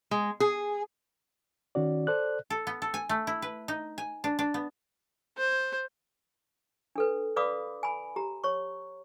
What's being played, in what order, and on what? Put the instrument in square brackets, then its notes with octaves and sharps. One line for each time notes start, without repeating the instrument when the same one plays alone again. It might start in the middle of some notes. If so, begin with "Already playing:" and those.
[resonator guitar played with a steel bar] G#3
G#4
[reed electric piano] D#3 C#4 F#4 D5
A4 C5 D5 F#6
[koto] A4
B3
A4
G#5
A3
E4
B4
D#4
G#5
D4
D4
B3
[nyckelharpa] C5
[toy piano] D4 A4 B4
B4 D5 F5 B5 D6 D#6
G#5 B5
G4 A#5
C#5 C#6